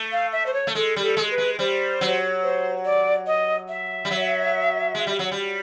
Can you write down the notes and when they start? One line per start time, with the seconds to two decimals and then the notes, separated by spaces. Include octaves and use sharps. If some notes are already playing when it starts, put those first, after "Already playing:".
Already playing: A3
0.12 F5
0.32 E5
0.46 C5
0.54 C#5
0.67 A3
0.75 G#3 A4
0.96 G3
1.03 A4
1.17 G#3
1.31 B4
1.38 G#3
1.59 G3 C5
2.01 F#3
2.43 C5
2.85 D5
3.27 D#5
3.69 E5
4.05 G3
4.11 F#3
4.95 G#3
5.07 G3
5.19 F#3
5.31 G3